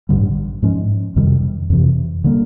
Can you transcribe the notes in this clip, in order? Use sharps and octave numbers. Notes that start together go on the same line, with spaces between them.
A1 G2 D3 G3
G#2 F3 G#3 C#4
F2 C3 D#3 G3
F2 C3 E3
D3 G3 A#3